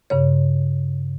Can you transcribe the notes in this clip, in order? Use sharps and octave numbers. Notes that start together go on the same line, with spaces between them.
G2 C#3 C#5